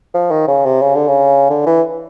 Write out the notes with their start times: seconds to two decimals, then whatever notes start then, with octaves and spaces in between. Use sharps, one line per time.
0.14 F3
0.31 D#3
0.48 C#3
0.65 C3
0.82 C#3
0.95 D3
1.08 C#3
1.50 D3
1.66 E3